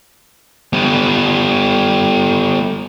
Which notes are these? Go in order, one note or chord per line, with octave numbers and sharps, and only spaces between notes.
G3 B3